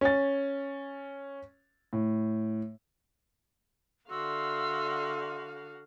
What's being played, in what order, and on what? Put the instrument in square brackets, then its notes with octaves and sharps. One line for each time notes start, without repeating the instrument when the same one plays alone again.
[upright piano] C#4 A6
A2
[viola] D3 F5 [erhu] F#4 [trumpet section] D5 E5 C6 [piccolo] E6